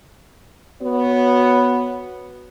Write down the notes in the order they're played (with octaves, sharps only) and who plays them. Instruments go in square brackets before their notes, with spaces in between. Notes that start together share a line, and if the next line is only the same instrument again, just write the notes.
[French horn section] B3 F#4 C#5